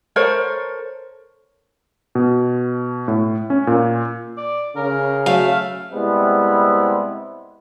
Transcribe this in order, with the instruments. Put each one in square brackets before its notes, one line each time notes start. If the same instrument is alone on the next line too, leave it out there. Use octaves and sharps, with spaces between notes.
[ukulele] A4 A#4 C5 C#5
[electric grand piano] B2
A2
C#4
A#2
[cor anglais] D5
[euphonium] C#3 [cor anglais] A#4
[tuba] F#3 [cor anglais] A3 [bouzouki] F5
[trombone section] C3 G3 G#3 B3 C4 E4